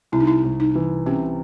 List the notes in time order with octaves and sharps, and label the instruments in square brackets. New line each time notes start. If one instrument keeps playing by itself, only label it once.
[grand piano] C2 [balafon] E4
[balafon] D#4
E4
[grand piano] C2
[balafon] D#4
[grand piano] E3
[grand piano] C3 [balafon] C#4